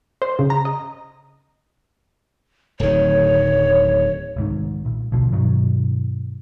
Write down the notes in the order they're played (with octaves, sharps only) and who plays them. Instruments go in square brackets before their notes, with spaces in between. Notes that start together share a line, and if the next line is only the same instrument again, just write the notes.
[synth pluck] C5
C#3
A#5
D#5
[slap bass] D1 D#3 [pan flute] C#5
[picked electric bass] C2 G#2 D#3
A#1
D2 B2 F3
G2 B2 D#3 F#3